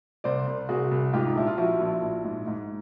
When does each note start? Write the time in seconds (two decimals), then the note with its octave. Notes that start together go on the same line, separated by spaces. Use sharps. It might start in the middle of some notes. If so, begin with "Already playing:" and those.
0.24 C2 C5 D5
0.47 C2
0.69 C2 F#4 G#4
0.91 C2
1.13 G#2 F4 G4
1.26 D#4
1.35 A#1 E4
1.47 F4
1.58 F3 E4 F#4
1.80 A#1
2.02 A#1
2.24 G#2
2.47 G#2